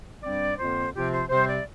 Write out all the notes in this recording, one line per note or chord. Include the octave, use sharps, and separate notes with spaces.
G2 G3 C4 D5
F2 D3 A#3 F4 C5
C3 F3 C4 F4 G4
C5
C3 G3 C4 C5
D5